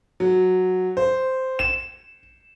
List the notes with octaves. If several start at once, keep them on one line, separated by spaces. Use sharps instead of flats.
F#3
C5
E7